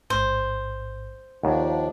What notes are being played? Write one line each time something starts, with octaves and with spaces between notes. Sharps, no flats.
A1 G#2 C5
D#2 F3 D4 D5 F#5 A5